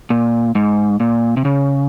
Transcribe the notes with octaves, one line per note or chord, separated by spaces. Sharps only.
A#2
G#2
A#2
C3
C#3